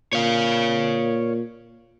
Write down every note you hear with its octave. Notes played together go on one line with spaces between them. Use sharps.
A#2 C#5 F5